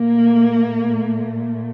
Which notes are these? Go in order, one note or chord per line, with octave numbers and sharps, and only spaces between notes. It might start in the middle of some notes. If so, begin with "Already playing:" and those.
Already playing: A#2 A3 A#3